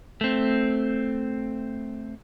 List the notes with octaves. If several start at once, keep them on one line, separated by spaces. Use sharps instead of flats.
A3 C4